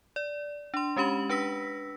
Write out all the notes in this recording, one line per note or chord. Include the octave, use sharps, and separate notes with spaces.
D5
D4 C6
G#3 C#4 G4 B5 F#7
D4 B4 E6 A#6 B6